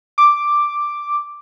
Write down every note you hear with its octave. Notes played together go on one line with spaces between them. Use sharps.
D6